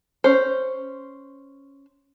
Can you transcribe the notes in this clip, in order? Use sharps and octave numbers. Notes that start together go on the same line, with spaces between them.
C#4 C5